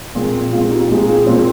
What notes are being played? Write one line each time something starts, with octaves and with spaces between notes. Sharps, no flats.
A#2 G#3 C4
A#2 G#3 C4 F4
D#4 G4
A#2 G#3 C4 D#4 G4
F4 G#4
A#2 G#3 C4 G#4 C5